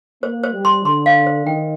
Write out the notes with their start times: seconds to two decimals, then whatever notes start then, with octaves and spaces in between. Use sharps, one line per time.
0.23 A#3 C5
0.43 C5
0.53 G3
0.65 C6
0.85 D3 C6
1.06 F5
1.27 C5
1.46 D#3 G5